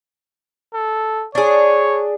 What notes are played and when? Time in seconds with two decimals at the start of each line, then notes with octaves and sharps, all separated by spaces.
0.75 A4
1.35 D4 G#4 C#5